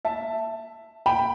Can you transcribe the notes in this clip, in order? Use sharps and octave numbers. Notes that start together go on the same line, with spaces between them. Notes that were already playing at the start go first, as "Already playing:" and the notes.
E5 A5
G5 B5